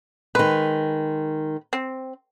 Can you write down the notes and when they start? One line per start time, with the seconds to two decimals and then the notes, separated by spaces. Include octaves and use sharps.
0.35 D#3 G#3 B4
1.73 C4